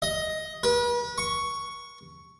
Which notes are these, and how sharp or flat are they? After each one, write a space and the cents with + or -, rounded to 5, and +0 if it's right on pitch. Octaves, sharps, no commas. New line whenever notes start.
D#5 +10
B4 -40
C#6 +5